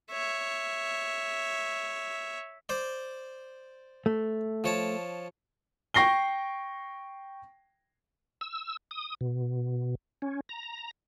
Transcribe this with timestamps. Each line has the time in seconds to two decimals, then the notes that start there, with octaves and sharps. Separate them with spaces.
0.11 C#5 E5
2.69 C5 D5
4.06 A3
4.64 F3 C#5 A5
5.94 G5 C#6 A#6 C7 G7
8.41 E6
8.91 D#6
9.21 B2
10.22 C#4
10.49 A#5